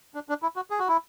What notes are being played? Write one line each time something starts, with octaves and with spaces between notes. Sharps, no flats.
D4
D4
E4
F#4
G#4
F#4
E4